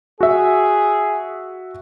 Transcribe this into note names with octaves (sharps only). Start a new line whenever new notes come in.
F#4 G#4 E5